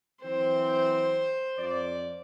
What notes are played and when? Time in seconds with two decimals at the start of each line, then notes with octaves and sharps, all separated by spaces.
0.23 E3 F#3 C4 C5
1.57 F2 F3 D5